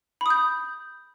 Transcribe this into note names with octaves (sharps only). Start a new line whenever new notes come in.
B5 D#6 G6